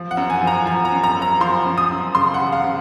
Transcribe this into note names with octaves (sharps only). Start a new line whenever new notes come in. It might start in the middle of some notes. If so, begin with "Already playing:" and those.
Already playing: F3
F#5
F#2
G#5
F3
A#5
F3 G#5
A#5
F#2
A#5
F#2
A#5
F3 C6
F#2
D#6
F#2
C#3 C6
F#5
C#3
F5
C#3